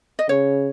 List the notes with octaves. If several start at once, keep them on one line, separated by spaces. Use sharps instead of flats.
D#5
C#3 C#5